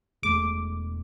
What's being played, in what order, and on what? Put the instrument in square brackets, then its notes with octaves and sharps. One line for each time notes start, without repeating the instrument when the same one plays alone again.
[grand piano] E1 E2 B2 A3 [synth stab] D6